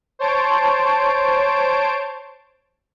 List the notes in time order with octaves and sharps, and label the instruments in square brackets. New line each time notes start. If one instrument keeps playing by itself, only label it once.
[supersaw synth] C5 C#5 A5 D7